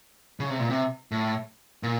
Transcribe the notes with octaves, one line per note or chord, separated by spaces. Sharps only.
C#3
C3
A#2
C3
A2
A#2